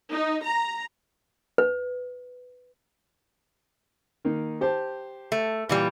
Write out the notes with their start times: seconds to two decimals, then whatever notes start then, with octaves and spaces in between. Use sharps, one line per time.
0.11 D#4
0.44 A#5
1.58 B4
4.25 D#3 A#3 D#4
4.61 G4 C5 A5
5.32 A3
5.69 A#2 E3 G3